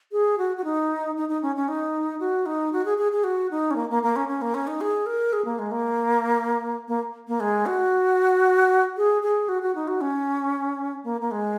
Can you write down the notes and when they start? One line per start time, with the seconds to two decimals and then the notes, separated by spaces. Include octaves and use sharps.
0.12 G#4
0.38 F#4
0.57 F#4
0.64 D#4
1.17 D#4
1.29 D#4
1.42 C#4
1.56 C#4
1.68 D#4
2.20 F#4
2.46 D#4
2.73 F#4
2.85 G#4
2.98 G#4
3.12 G#4
3.24 F#4
3.51 D#4
3.71 C#4
3.76 A#3
3.90 A#3
4.03 A#3
4.16 C#4
4.28 C#4
4.42 A#3
4.54 C#4
4.67 D#4
4.81 G#4
5.06 A#4
5.33 G#4
5.45 A#3
5.59 G#3
5.71 A#3
6.88 A#3
7.28 A#3
7.40 G#3
7.66 F#4
8.97 G#4
9.22 G#4
9.49 F#4
9.62 F#4
9.75 D#4
9.88 F#4
10.01 C#4
11.04 A#3
11.21 A#3
11.31 G#3